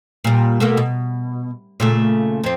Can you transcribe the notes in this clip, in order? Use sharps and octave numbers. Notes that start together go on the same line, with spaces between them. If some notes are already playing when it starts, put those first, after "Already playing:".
A#2 G3
B2 A3 A#3
B2
A#2 C#3 A3
F2 C4